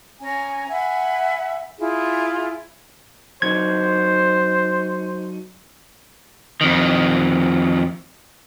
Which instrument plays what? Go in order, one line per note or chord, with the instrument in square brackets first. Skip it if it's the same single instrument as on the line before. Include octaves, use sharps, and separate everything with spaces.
[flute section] C#4 G#5 A#5
E5 F#5 G#5 B5
E4 F4 G#4
[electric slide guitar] F#3 D4 D#4 [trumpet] C5 [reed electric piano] G#6
[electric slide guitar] F2 D#3